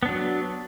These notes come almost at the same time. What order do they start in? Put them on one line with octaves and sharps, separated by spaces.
B3 D4 F#3